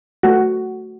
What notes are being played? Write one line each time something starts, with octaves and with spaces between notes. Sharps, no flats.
A3 F#4